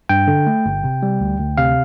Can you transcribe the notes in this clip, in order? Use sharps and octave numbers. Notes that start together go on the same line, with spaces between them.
G2 G5
D3
A3
G1
C3
G3
D2
D2
C3 F5